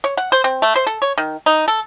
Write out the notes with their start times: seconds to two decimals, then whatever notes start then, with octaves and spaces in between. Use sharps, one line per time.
0.04 C#5
0.17 F#5
0.32 C5
0.44 C4
0.62 A3
0.76 C5
0.87 A4
1.02 C#5
1.18 D#3
1.46 D#4
1.68 A4